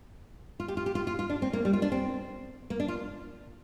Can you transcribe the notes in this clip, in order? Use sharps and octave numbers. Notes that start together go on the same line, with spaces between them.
F4
G4
F4
G4
F4
F4
F4
D4
C4
A#3
G3
F4
D4
C4
A#3
D4
F4